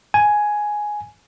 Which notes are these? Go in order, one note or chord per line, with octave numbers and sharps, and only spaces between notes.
G#5